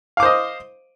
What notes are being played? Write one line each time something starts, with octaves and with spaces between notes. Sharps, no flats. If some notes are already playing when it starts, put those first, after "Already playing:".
C5 D#5 F5 D6